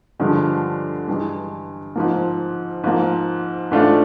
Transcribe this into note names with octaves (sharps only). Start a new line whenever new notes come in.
G2 D3 F3 G#3
G2 E3 G#3
G#2 F3 A#3
G#2 F3 A#3
G#2 E3 A3 D4 F4